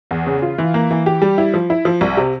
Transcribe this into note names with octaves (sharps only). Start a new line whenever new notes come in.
E2
C#3
F4
E3
A#3
E3
G4
G3
E4
F3
E4
F3
C2
C3